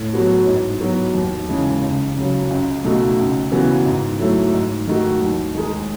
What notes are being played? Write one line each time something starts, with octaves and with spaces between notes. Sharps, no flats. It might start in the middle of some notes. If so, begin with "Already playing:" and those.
Already playing: A2
F#3 B3 F#4
G#2
F#3 B3 F#4
D#2
C#3 E3 G#3
C#2
C#3 F#3
C#2
B2 A3 D#4 F#4
C#2
C#3 E3 B3 F#4
G#2
F#3 A3 E4
G#2
D#3 A3 D#4 F#4
D#2
D#3 G#3 D#4 G#4